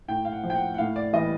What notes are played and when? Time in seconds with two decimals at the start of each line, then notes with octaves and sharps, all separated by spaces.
0.08 A2 G5
0.25 F5
0.32 F#5
0.43 F3
0.50 G5
0.55 F#5
0.74 F#5
0.78 A2 F5
0.96 D5
1.13 E3 G3 D#5